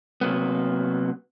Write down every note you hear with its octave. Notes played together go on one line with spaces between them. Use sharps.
C3 F#3 A#3 B3